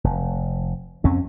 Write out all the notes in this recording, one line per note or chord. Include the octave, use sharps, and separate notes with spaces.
F1
F2 C4 C#4